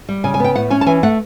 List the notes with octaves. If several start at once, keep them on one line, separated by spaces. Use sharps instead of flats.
G3
C#3 G#5
G#5
B3 G5
A2 F#5
C#4 G#5
A5
E3 G#5
A3 F#5